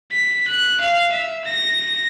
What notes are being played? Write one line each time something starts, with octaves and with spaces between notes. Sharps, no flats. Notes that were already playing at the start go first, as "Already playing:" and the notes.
B6
F#6
F5
E5
A#6